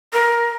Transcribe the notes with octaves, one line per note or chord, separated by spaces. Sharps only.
A#4